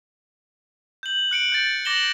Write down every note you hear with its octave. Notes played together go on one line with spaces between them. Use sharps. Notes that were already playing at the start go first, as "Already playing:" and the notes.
G6 F#7
F#6 C#7 D7 F#7
G6 A6
D6 A6 A#6 E7 F#7 G7